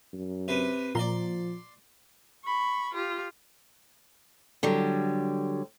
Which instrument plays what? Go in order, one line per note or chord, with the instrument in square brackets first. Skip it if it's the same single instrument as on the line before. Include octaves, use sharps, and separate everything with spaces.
[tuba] F#2
[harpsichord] C3 B4
[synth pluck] A#2 A#5 [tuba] F3 [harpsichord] D5 C6
[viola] B5 C#6
F4 G4
[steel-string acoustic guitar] D3 F#3 G3